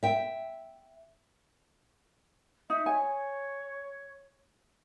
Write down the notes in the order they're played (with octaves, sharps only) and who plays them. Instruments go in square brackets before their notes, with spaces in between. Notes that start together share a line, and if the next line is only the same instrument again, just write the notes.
[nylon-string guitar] E5 G5
[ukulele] D#4 [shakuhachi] E5
[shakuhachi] C#5 [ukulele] G#5